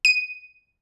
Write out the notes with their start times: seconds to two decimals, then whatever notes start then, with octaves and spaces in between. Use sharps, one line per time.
0.05 D#7